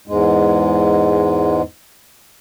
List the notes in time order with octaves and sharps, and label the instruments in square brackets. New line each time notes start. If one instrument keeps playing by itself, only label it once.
[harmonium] E2 G#2 G#3